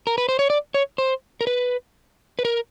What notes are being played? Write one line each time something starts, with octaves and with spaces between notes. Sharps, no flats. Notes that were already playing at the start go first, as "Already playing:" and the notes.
A#4
B4
C5
C#5
D5
C#5
C5
A#4
B4
B4
A#4